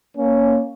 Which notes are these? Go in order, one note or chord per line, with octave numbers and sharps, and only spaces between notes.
A#3 C#4